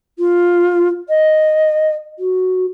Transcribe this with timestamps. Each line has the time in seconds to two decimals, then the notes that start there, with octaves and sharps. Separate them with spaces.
0.19 F4
1.08 D#5
2.19 F#4